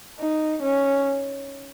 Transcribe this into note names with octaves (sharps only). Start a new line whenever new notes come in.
D#4
C#4